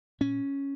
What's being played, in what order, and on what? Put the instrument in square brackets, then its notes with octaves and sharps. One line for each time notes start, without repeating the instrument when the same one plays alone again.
[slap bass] A#2 C#4